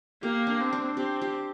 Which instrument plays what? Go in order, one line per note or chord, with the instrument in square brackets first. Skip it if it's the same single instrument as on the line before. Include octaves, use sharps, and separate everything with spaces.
[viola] A#3 [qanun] G4
[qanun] D4
[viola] C4
[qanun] D4
[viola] C4 [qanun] G4
[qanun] G4